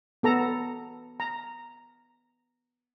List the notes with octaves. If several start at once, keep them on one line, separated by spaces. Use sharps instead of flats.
B3 A4 A#5
A#5